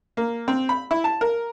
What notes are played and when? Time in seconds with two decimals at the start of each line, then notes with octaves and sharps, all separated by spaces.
0.17 A#3
0.48 C4
0.69 B5
0.91 E4
1.04 A5
1.21 A#4